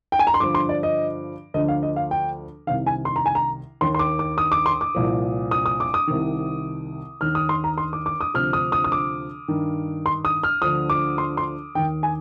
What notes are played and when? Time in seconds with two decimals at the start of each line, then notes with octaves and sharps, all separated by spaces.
0.12 G5
0.19 G#5
0.27 A#5
0.34 C6
0.40 G2 D3 F3 D6
0.55 C6
0.69 D5
0.83 D#5
1.54 D2 D3 F3 D#5
1.68 F5
1.83 D#5
1.96 F5
2.11 G5
2.67 C2 C3 D#3 F5
2.87 G#5
3.05 C6
3.16 A#5
3.26 G#5
3.35 A#5
3.81 D#2 D#3 C6
3.94 C6
3.99 D6
4.19 D6
4.38 D#6
4.52 D6
4.66 C6
4.81 D6
4.95 C2 A#2 F3
5.51 D#6
5.66 D#6
5.80 D6
5.94 D#6
6.07 C2 C3 D#3
7.21 D#2 D#3 F6
7.35 D#6
7.49 C6
7.64 A#5
7.78 C6
7.93 D6
8.06 D6
8.21 D#6
8.34 D2 C3 F3 F6
8.53 D#6
8.72 D#6
8.84 D#6
8.92 D6
9.48 G2 D#3
10.06 C6
10.25 D#6
10.43 F6
10.62 D2 D3 F3 D#6
10.90 D6
11.18 C6
11.37 C6
11.75 D#3 G5
11.79 D#2
12.03 G#5